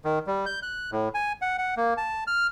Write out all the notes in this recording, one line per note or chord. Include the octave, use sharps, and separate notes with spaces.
D#3
G3
G6
F#6
A2
G#5
F#5
F#5
A#3
A5
F6